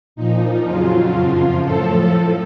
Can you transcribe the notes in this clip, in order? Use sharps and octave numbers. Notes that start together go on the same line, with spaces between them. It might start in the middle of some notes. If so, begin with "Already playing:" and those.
A#2 F3 D#4
F2 C#3 F#3 F4
F#2 F3
A2 F3 A4